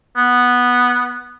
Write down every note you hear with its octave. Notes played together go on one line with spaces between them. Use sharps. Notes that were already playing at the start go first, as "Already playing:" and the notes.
B3